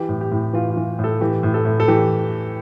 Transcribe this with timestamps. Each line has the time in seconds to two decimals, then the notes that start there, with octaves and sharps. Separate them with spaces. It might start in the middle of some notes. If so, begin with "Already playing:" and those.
Already playing: E3 G4
0.09 A2
0.21 G4
0.31 A2
0.53 E3 F4
0.71 F4
0.77 E3
0.99 A2
1.04 A4
1.21 E3 G4
1.43 A2
1.54 A4
1.65 A2
1.80 A4
1.88 E3 G4